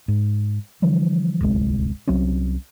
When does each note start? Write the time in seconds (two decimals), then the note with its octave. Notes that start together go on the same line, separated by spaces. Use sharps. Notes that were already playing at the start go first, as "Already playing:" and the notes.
0.08 G#2
0.82 D3 E3 F3 G3
1.41 D1 G1 C2 G#3
2.07 C2 F#3 C4 C#4